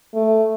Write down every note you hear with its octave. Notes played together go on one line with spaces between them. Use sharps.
A3